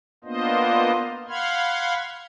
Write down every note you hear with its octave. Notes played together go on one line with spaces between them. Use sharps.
A#3 B3 D4 F4 C5 D#5
F5 F#5 B5 C6 F6 G#6